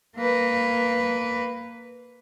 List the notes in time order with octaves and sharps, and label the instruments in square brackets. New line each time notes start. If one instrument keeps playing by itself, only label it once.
[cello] A#3 B4